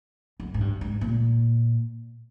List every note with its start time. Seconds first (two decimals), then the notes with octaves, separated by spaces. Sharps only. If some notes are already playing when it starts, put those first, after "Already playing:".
0.40 F#2
0.54 G#2
0.61 G2
0.81 G#2
1.01 A#2